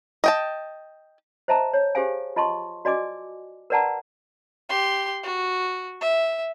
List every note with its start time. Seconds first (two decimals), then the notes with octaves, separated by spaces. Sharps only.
0.24 D#5 G5 A5
1.48 C5 D#5 E5 A5 A#5
1.73 C#5
1.95 G4 G#4 C5 F5 G#5
2.36 F4 D#5 A5 C6 C#6
2.85 F#4 D5 D#5 G#5 D6
3.70 A#4 B4 D5 F#5 A5 A#5
4.69 G4 C6
5.23 F#4
6.01 E5